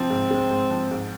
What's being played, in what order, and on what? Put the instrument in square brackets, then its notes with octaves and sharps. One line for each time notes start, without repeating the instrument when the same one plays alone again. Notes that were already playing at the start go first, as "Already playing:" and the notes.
Already playing: [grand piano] C3 F3 [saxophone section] C4
[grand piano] G#2
G#3
G#2
F3
G#2